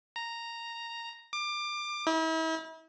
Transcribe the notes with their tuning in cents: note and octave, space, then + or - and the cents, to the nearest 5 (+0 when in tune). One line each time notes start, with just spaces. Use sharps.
A#5 -5
D6 +25
E4 -40